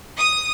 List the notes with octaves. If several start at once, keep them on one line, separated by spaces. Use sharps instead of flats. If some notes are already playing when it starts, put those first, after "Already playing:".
D#6